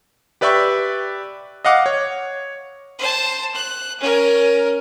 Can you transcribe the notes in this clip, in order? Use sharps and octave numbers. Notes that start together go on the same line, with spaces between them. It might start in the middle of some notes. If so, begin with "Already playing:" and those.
G4 B4 D5 E5 G5 C#6
D#5 F5 F#5 D6
C#5
C5 A5
F#6
C#4 A#4